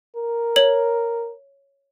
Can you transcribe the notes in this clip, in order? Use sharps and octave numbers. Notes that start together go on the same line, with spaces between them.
A#4
C#5 F#7